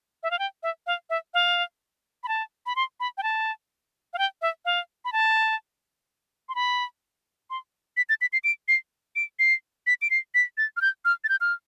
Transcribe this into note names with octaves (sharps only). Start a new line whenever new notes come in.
E5
F5
G5
E5
F5
E5
F5
B5
A5
B5
C6
B5
G5
A5
F5
G5
E5
F5
B5
A5
C6
B5
C6
B6
A6
B6
C7
D7
C7
D7
C7
B6
D7
C7
B6
A6
F6
G6
F6
A6
G6
F6